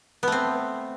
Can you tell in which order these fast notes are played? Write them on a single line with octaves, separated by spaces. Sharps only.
B3 A3 C4